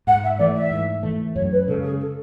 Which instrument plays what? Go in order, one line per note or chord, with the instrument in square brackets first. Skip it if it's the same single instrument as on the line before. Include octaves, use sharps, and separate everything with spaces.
[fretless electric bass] G#2 [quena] F#5
[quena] E5
[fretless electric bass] E3 A3 [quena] D5
[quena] E5
[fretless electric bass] G#2
E3 A3
[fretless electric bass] F#2 [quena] C#5
[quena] B4
[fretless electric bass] C#3 G#3 [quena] A4
[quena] G#4
A4